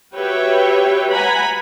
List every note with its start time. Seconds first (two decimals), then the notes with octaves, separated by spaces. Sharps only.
0.14 F#4 G4 B4 C#5 E5 G5
1.10 F#5 G#5 A#5 B5